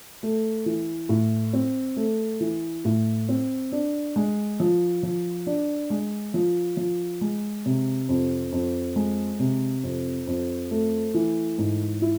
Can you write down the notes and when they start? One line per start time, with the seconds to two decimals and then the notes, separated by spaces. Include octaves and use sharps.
0.23 A3
0.66 E3
1.09 A2
1.53 C4
1.96 A3
2.40 E3
2.85 A2
3.29 C4
3.72 D4
4.16 G#3
4.60 F3
5.03 F3
5.47 D4
5.90 G#3
6.34 F3
6.77 F3
7.21 G#3
7.66 C3
8.09 F2
8.52 F2
8.96 G#3
9.39 C3
9.83 F2
10.27 F2
10.71 A3
11.14 E3
11.58 G#2
12.02 E4